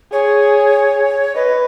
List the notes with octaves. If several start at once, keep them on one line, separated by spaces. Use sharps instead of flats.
G#4 C#5
B4 D#5